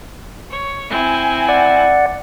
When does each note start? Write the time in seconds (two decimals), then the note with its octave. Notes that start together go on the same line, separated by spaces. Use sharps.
0.50 C#5
0.90 C4 E4 G#5
1.49 D5 F#5